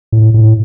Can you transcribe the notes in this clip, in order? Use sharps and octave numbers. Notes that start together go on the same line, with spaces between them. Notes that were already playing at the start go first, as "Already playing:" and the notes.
A2
A2